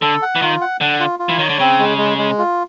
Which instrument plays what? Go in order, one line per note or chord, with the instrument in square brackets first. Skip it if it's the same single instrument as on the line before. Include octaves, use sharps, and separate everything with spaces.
[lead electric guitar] D3 [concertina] A4
[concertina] F#5
[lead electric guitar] E3
[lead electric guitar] D#3 [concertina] F4
[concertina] F#5
[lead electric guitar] D3 [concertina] F#5
[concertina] F4
F4
[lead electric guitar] E3
[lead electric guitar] D#3 [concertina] C#5
[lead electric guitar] D3
[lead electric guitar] C#3 [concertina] C4
[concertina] G#3
G#3
G#3
F4